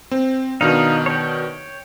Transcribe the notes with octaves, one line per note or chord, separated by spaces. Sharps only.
C4
B2 D#3 D4 D#4 F5
C#5 G5